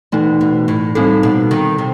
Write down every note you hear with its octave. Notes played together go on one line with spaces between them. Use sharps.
B2 E3 A3 D#4
B2
A2
A2 G3 C4 D#4 A4
B2
D#3
C3